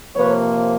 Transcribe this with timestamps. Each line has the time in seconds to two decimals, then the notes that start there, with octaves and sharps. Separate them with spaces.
0.15 C3 F3 A#3 B4 C#5